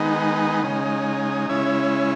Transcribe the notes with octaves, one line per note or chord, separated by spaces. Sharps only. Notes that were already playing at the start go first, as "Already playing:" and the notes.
Already playing: D#3 G#3 B3 D#4
C#3 G#3 D#4
C#3 G#3 C#4 E4